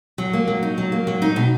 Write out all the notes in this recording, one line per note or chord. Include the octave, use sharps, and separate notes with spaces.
F#3
A#3
F#3
D#4
F#3
A#3
F#3
D#4
B2